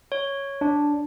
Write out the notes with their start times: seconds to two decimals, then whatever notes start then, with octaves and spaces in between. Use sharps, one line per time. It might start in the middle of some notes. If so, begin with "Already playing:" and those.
0.12 C#5
0.61 D4 D5